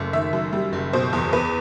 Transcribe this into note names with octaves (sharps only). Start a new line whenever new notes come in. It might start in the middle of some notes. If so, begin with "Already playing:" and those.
Already playing: F#1 F#2 A3
D#3 E5
F#2
G3
F#1
B2 C5
E2
E2 B4